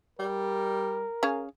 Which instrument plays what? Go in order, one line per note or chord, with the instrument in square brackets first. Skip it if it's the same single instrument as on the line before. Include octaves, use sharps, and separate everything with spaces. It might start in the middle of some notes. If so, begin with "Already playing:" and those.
[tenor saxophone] G3 [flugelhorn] A#4
[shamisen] C#4 G#4 F5